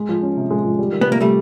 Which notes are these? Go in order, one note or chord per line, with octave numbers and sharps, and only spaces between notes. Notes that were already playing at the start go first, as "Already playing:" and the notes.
Already playing: G#3
F3
C#4
C3
G#3
F3
G3
D#3
B3
C3
A#3
C3 G3 A3